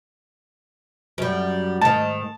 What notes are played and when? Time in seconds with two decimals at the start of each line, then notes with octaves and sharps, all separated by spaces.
1.18 F#2 G3
1.81 G#2 D#3 A5